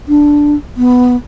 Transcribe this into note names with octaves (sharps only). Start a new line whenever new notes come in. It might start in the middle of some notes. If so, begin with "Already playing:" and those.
D4
B3